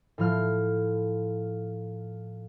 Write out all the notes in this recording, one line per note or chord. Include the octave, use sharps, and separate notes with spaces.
A2 F3 F6